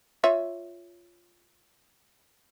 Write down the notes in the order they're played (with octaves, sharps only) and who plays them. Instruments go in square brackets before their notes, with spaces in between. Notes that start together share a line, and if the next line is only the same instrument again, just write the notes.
[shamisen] F4 C#5 E5